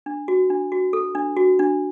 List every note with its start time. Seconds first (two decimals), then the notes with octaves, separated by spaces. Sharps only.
0.06 D4
0.28 F#4
0.50 D4
0.72 F#4
0.93 A4
1.15 D4
1.37 F#4
1.59 D4